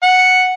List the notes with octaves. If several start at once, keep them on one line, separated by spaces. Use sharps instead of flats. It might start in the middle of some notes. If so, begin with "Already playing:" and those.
F#5